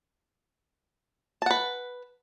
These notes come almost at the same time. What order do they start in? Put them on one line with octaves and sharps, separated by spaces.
A5 F#5 B4